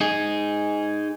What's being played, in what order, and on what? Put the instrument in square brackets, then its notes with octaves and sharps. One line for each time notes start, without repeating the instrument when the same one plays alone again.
[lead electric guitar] D#4 G#4